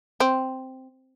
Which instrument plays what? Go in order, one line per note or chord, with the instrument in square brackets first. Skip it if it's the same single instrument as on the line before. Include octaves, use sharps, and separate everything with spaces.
[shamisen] C4